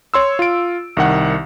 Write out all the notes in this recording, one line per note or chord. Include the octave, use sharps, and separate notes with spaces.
C#5 C6 E6
F4 D7
C2 D#3 F#5